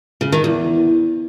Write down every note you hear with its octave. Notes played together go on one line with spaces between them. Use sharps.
C#3
D#3
E2